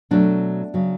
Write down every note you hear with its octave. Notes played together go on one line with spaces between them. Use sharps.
B2 F#3 A3 D4
C#3 F#3